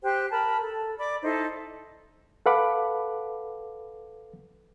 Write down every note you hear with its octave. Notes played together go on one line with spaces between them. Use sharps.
G4 C5 G5 F#6
A#4 A5 B5
A4
D5 B5 D6
D#4 E4 A4 C5
A4 B4 F5 F#5 B5 D6